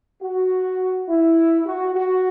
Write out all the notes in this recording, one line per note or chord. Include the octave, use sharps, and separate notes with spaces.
F#4
E4
F#4
F#4